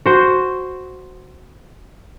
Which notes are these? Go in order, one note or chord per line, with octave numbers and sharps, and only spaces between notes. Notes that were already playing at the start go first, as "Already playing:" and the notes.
F#4 C5